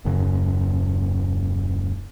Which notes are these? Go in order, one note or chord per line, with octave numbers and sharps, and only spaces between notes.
D#1 F#2 C#3